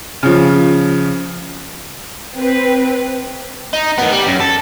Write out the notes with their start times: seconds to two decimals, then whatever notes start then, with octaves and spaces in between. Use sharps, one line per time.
0.23 C#3 F3
2.35 C4 B4
3.73 D#4
3.98 D#3 B3
4.12 G3
4.26 F#2
4.40 A4